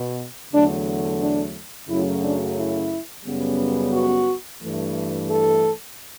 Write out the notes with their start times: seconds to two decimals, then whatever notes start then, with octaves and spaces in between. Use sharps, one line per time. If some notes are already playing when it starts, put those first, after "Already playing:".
Already playing: B2
0.51 E2 D3 F#3 A3 D4
1.20 D4
1.89 F#2 C#3 F#3 A3 E4
2.23 D4
2.57 E4
3.25 F#2 C#3 G3 B3
3.93 F#4
4.61 G2 E3 A3
5.29 A4